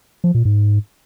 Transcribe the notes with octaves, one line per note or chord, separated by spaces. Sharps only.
F3
A#2
G#2